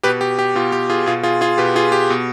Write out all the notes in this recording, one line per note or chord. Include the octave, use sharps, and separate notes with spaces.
B2 G4 B4
G4
G4
B2 F4
G4
F4 G#4
B2 F4 G#4
F4 G#4
F4 G#4
B2 G4 B4
F4 G#4
G4
B2